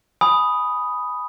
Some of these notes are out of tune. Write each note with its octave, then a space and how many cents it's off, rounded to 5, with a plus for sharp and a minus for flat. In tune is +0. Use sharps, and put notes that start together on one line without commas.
G#5 +0 B5 +0 D#6 +0